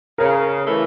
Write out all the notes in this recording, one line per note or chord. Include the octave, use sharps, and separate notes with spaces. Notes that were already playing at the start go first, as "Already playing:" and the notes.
C#3 A#4
E3 A3